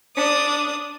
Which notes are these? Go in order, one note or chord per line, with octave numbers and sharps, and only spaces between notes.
D4 D#6